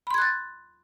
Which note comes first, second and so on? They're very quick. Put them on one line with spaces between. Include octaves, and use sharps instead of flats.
B5 C6 G#6 F#6 A6